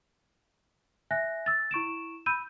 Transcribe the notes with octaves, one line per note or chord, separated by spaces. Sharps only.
E5 G#5 F#6 A#6
E6 A6
E4 C#6 D7 E7
B5 E6 G6 D#7